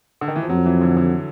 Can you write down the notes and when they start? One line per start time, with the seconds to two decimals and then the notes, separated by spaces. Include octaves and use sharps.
0.21 D3
0.28 D#3
0.36 E3
0.43 F3
0.49 F2 F#3
0.66 E3
0.81 D3
0.97 D3